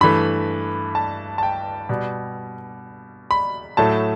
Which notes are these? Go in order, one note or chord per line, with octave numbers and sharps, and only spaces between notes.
G2 E3 A3 B5
A5
A5
G5
B2 G3
B5
A2 F#3 A3 A5